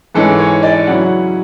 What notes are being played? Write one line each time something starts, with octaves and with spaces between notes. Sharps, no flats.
G#2 E3 G#3 C#4 A4
C#5
D5
C#3 F#3 C#4 E4 F#5